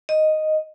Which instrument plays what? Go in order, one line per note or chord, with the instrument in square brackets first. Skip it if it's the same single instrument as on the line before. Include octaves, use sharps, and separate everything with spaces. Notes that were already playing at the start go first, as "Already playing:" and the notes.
[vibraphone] D#5